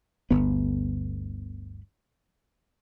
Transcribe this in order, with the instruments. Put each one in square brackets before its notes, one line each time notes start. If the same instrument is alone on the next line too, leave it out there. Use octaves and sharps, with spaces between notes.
[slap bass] G1 D2 B3